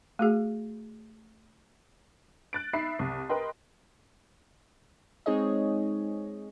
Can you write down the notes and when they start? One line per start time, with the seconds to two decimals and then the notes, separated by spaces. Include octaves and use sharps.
0.19 A3 F#4 G#4
2.53 F#6 A6 D7
2.73 D#4 E5 B5 C7
2.99 C2
3.29 A#4 B4 D#5 G5 C6
5.26 G#3 C4 D#4 G#4 C#5 D#5